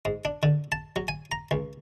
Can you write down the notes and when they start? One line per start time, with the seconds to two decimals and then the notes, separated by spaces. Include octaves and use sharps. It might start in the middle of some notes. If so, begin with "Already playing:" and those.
0.05 G#2
0.25 D4
0.43 D3
0.72 A5
0.96 F#3
1.08 G#5
1.32 A#5
1.51 C#2